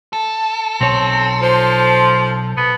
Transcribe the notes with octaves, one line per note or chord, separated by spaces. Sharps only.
A4
B1 C4 C#5
F3 C5
B3